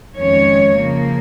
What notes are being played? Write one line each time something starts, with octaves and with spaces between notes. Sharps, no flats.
F2 D#3 G#3 C#4 C#5
C#3 F3 A#3